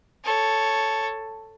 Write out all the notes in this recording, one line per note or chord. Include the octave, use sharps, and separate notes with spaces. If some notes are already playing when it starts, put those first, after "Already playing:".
A4 C#5